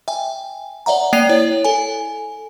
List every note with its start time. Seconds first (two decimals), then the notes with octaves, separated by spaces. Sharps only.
0.08 E5 G5 G#5
0.86 C#5 D5 E5 F#5 A#5
1.13 A#3 D5 G5 C7 D#7 F7
1.29 E4 C#5
1.64 A4 G#5